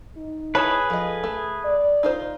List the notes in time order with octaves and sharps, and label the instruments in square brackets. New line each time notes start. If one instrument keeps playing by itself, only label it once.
[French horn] D#4
[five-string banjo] E4 C#5 A5 [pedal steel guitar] G#4 B4
[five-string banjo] F3 D#5 [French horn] A4
[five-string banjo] A3
[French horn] D5
[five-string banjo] D#4 F4 C5